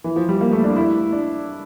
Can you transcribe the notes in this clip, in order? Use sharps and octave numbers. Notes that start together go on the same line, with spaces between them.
E3
F3
G3
A#3
A3
D4
E4
D4